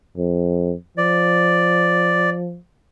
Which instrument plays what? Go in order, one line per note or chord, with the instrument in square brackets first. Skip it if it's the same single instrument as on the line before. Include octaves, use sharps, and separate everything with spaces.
[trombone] F2
[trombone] F3 [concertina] D5